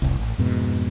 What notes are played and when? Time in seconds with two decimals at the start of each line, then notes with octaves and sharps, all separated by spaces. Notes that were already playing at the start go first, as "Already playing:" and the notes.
0.02 F1 C2
0.19 A1
0.38 F2 G#2 B2